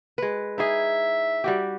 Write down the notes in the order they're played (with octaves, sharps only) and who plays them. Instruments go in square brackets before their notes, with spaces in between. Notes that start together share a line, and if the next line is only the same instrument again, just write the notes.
[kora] G#3 B4
[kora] D#4 E4 G#4 [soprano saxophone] E5
[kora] G3 F#4 G4